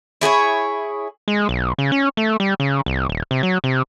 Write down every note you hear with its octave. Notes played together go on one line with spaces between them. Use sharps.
E4 G#4 B4 C#5
G#3
B1
C#3
C#4
A3
G3
C#3
C2
D#1
C3
F#3
C3